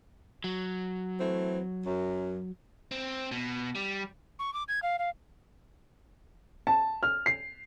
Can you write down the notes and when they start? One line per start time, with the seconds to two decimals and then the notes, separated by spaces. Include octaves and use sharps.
0.44 F#3
1.20 E3 A3 C4
1.86 F#2
2.91 C4
3.31 B2
3.75 G3
4.39 C#6
4.54 D6
4.68 G#6
4.83 F5
4.99 F5
6.67 A5
7.03 F6
7.26 C7